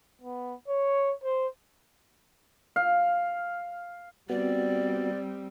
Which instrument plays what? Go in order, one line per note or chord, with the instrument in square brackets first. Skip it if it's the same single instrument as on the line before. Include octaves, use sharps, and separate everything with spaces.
[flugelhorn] B3
C#5
C5
[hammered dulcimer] F5
[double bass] G3 C4 [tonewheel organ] B3 F#4 [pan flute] D5